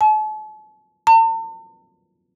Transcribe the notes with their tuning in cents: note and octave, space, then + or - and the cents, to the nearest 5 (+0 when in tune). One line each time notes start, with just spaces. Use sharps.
A5 -40
A5 +45